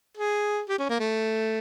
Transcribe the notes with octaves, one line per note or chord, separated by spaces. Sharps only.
G#4
G4
C#4
A#3
A3